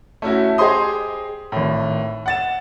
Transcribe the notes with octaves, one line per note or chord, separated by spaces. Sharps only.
A3 C#4 E4 F#4
G4 G#4 C5 D#5 C6 D#6
G#1 A2
F#5 A6 E7